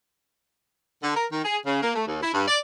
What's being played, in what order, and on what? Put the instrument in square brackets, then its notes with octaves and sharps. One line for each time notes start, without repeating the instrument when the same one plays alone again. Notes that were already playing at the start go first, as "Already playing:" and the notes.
[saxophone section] D3
A#4
D#3
G#4
C#3
A#3
A3
D#2
E4
G2
D5